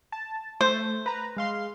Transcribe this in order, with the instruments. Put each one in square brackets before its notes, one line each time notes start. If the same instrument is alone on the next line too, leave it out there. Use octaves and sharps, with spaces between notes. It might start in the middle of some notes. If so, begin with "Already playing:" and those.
[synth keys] A5
[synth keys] A3 [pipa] C5
[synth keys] B4 A#5
G#3 F5 C6